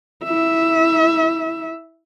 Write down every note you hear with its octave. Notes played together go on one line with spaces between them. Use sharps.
E4 E5